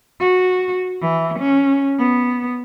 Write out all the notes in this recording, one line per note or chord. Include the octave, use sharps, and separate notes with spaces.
F#4
E3
C#4
B3